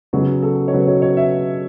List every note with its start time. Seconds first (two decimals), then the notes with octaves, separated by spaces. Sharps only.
0.13 C#3 F#3 B3 F#4
0.43 A4
0.68 C#5
0.73 C#3 F#3 B3 B4
0.88 C#5
1.02 C#5
1.17 E5